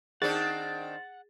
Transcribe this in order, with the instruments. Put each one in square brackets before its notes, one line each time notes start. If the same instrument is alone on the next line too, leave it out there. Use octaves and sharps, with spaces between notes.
[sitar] D#3 C4 D4 [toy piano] G#4 [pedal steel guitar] F#5 [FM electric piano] A6